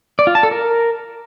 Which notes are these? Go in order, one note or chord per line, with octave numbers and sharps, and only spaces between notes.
D5
F4
A5
A4
A#4